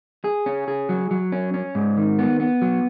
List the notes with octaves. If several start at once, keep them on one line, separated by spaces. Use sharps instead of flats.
G#4
C#4
G#4
F#3
F#3
C#4
C#4
G#2
D#3
B3
B3
F#3